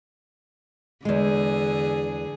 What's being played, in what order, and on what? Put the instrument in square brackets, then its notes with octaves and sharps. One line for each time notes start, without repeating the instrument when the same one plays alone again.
[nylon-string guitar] E2 G#3 [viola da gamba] D3 G#4